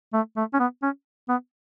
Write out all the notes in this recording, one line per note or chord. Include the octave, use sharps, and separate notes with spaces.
A3
A3
C#4
B3
C#4
B3